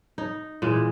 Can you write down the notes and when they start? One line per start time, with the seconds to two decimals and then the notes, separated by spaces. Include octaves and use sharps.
0.18 D#4
0.62 A#2 E3 G#3